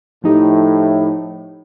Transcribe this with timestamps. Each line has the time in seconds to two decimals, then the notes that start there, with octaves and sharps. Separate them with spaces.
0.24 A2 F3 D#4 G4